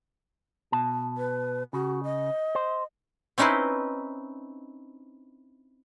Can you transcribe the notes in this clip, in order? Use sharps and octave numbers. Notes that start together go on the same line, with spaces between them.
B2 A5
B4
C#3 F#4
D#5
C5
C4 C#4 D#4 E4 B4 C5